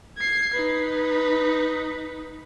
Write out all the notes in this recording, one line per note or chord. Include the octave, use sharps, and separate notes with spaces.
G#6 C7
D#4 B4